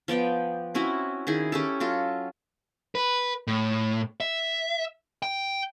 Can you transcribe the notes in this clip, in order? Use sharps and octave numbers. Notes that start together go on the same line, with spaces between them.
F3 B3 D5 G5
C4 C#4 E4 F#4
D#3 E4 G#4
C#4 G4 A4
F#3 F4 A4
B4
A2
E5
G5